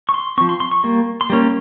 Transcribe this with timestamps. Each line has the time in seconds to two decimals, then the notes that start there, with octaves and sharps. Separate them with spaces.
0.09 C#6
0.14 C6
0.38 F3 C4 C#6
0.49 C6
0.60 C6
0.71 C#6
0.84 G3 A#3
1.21 C6
1.30 G3 A#3 C#4